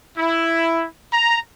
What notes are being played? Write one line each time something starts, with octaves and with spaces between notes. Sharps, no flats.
E4
A#5